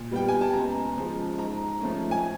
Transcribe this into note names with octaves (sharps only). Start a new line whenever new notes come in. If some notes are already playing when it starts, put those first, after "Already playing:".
Already playing: A#2
G3 B3 G5
G#5
A5
C#2 A#5
C#3 F3 G#3
G#2 A#5
F3 A3 C#4
G#5